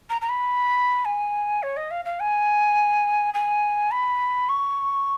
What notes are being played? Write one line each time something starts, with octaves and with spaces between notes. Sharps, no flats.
A#5
A#5
B5
G#5
C#5
D#5
F5
F5
G#5
G#5
B5
C#6